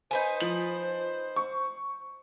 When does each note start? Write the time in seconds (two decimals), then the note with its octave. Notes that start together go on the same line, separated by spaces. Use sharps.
0.11 D#4 B4 C5 G#5
0.41 F3 F#7
1.36 C#6